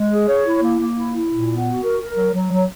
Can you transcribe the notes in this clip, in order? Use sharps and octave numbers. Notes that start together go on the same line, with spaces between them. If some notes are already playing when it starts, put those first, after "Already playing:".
Already playing: G#3
G#4
C#5
E4
A#3
A#3
E4
E4
A#2
B3
F#4
A#4
A#4
F#3
F#3
F#3